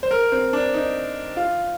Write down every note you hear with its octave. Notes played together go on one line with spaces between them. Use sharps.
C5
A#4
C4
D4
D#4
F4